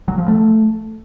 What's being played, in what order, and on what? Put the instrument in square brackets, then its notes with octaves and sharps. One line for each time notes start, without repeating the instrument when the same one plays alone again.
[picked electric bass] F#3
F3
A3